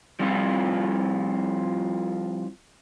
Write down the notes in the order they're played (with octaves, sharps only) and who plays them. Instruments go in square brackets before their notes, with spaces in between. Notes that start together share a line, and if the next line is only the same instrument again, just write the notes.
[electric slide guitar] F3 G3 C4 E4 F4